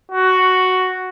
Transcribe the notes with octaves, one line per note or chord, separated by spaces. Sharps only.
F#4